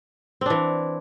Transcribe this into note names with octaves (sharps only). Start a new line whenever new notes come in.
E3 C4 D4